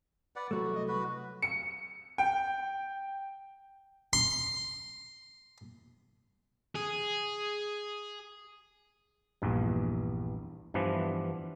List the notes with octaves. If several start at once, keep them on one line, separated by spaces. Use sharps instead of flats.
B4 D5 F#5
C2 F#3 A3 F#4
D#5
F#4 B4
C#7
G5
C6
G#4
A#1 E2 G2
G2 E3 F3 B3 D4